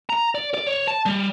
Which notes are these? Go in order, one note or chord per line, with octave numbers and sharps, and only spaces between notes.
A#5
D5
D5
C#5
A5
G3